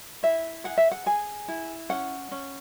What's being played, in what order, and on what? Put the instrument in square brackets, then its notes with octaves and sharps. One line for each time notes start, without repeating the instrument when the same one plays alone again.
[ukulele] E4 E5
G#4 F#5
E5
F#5
G#4 G#5
E4
C#4 F#5
C#4